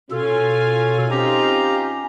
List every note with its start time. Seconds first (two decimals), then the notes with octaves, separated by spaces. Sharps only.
0.11 B2 C#4 F4 A4 G#5
1.11 C4 C#4 D#4 F4 G4 A#5